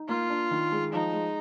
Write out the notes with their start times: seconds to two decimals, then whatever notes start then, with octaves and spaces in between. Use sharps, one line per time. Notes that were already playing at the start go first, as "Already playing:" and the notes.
Already playing: D#4
0.08 A#3 F4
0.30 D4
0.51 D#3
0.72 G#3
0.93 F3 D#4
1.13 G#3